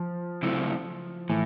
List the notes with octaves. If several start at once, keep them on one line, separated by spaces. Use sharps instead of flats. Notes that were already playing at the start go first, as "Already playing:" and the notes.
Already playing: F3
C#3 F#3 A3 C4 E4
A2 E3